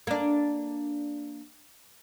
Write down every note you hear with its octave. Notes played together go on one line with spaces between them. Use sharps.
A#3 D4